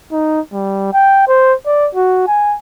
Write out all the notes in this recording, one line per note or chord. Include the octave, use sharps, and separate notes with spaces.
D#4
G3
G5
C5
D5
F#4
G#5